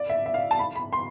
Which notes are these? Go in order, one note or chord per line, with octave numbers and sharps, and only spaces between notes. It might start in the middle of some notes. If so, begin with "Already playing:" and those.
Already playing: D5
E5
E5
F5
A5
B5
B5
C6